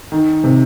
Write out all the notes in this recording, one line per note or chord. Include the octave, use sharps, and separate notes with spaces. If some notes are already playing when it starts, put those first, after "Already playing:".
D#3
C3